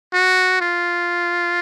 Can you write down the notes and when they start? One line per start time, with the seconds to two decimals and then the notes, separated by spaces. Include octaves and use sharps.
0.14 F#4
0.61 F4